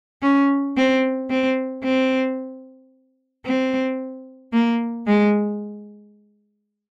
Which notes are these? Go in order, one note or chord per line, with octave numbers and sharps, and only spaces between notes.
C#4
C4
C4
C4
C4
A#3
G#3